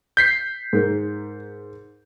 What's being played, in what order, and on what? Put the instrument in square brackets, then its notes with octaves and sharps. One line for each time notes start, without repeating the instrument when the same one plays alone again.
[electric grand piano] G6 B6 C7
[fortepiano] G#2 A#4